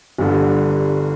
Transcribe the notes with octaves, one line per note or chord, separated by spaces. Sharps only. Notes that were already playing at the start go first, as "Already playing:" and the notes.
G1 G2 D3